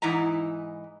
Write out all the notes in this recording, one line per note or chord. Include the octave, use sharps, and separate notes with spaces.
G#2 E3 D#4 E4 A#5